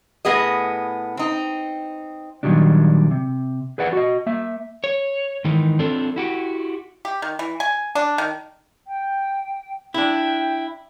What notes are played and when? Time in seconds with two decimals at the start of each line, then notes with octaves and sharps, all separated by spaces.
0.25 A2 B3 G#4 D#5
1.17 C4 D#4
2.43 A#2 D#3 F#3 G3 D4
3.11 C3
3.78 G#4 B4 D5 F#5
3.93 F#4 D#5
4.26 A#3 E5
4.84 C#5
5.45 G#2 D#3 E3 D#4
5.79 C4 D4 F4 A4
6.16 E4 F#4 G4
7.05 G4
7.22 D#3
7.39 E3
7.60 G#5
7.95 D4
8.18 D#3
8.87 G5
9.94 D4 E4 G5